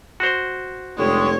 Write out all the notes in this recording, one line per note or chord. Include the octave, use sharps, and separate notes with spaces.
F#4 C5
F1 D3 G3 G#3 C#5